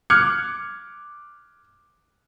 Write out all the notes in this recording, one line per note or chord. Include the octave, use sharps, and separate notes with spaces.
D6 F6 F#6 G#6 C#7